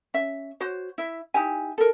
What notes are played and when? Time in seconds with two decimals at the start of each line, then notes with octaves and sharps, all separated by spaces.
0.14 C#4 E5
0.60 F#4 C5 C#5
0.98 E4 E5
1.34 D#4 E4 G4 G#5
1.78 A4 A#4